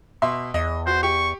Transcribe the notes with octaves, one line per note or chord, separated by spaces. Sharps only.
B2 E5 C6
E2 D#5
F#4 C5
G4 C#6